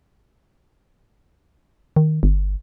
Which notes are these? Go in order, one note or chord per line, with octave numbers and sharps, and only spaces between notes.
D#3
G1